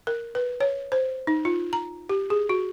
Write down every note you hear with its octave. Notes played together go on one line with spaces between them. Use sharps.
A#4
B4
C#5
C5
D#4
F4
A#5
G4
G#4
F#4